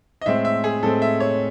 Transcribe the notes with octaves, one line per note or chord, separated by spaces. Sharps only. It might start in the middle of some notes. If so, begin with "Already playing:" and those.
D#5
A2 G#3 C4 E5
E5
G#4
A2 G#3 C4 A4
E5
C#5